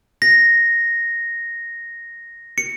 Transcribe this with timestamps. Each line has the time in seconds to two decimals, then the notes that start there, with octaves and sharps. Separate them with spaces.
0.22 A#6
2.58 C#7